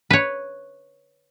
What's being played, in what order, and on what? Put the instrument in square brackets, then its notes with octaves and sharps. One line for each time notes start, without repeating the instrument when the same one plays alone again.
[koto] B4 C#5